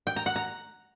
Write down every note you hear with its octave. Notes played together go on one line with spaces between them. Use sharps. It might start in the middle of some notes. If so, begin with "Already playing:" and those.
G5
A#5
F#5
A#5